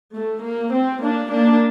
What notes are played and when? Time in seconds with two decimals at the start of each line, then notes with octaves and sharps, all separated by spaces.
0.15 A3
0.43 A#3
0.73 C4
1.02 A#3 D4
1.31 A#3 D4